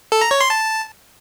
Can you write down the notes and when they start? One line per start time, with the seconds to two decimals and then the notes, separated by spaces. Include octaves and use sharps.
0.12 A4
0.21 A#5
0.31 C#5
0.41 C6
0.50 A5